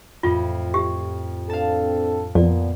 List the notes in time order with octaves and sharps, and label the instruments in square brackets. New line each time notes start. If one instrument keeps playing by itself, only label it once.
[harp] F2 A2 F3 [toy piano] F4
[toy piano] G4
[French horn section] C4 D4 A4 [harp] F5 A5
[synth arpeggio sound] F2 [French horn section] A#2 B3 [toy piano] D5